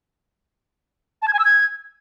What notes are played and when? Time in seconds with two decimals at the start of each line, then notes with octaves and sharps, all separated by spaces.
1.22 A5
1.28 G#6
1.33 G#5
1.39 E6
1.45 G#6